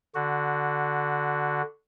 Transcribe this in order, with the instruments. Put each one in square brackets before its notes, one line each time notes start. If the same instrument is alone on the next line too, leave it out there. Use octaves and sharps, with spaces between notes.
[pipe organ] D3 F#4